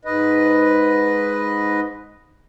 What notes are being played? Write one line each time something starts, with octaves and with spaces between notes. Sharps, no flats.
G#2 B4 D#5